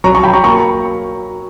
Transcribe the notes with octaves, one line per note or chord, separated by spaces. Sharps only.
F#3 A#5 C#6
A#5 C#6
F#3 G5 B5
A#5 C#6
A#3 A#5 C#6